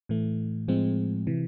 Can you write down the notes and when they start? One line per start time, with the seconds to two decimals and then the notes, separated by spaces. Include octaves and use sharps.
0.09 A2 E3 A3
0.68 A2 F3 G#3 C4
1.27 C3 E3